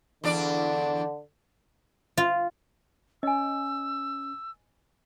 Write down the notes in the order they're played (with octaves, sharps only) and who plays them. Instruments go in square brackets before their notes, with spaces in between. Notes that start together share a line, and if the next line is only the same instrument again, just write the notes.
[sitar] E2 D4 D5 [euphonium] D3
[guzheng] F4
[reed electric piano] C#4 [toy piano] D#5 G#5 [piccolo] E6